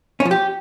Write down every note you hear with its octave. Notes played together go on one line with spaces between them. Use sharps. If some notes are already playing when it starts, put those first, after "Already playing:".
C#4
F3
G4